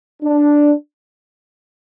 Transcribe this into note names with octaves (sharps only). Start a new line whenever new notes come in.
D4